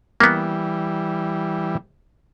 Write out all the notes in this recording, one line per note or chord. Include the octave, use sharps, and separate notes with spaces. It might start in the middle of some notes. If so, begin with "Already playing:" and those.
E3 G3 A#3 B3